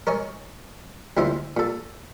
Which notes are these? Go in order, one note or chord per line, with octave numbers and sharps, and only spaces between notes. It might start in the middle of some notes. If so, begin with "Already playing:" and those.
A#4 C#5 D#5 G#5
D2 A#2 E4 C5 D#5 B5
A#2 A4